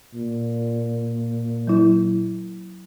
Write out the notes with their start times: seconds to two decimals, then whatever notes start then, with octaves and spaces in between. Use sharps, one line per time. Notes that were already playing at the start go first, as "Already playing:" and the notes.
0.14 A#2
1.67 F#3 E4